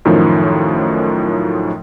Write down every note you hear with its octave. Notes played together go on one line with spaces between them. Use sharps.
F#2 A2 D#3 F3